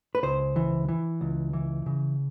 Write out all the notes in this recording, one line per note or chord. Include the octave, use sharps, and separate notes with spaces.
B4
C#2 C5
E3
E3
C#2
E3
C#3